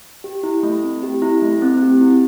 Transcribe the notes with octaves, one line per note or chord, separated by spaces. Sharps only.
G4
E4
A3
C4
G4
E4
A3
C4
G4
E4